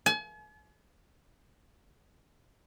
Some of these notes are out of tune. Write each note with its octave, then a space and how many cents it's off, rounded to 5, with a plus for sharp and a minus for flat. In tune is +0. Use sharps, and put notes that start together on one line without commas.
G#5 +40